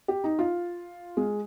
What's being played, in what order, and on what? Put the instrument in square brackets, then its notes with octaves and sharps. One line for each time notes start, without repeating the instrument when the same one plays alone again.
[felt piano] G4
D#4
F4
G#3